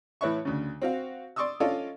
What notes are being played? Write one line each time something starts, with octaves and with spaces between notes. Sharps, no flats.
A2 E3 B4 C#5 E5 C#6
D2 C#3
C4 F#4 F5
D5 C6 C#6 D#6 E6
C#4 F4 A4 D5 D#5 F5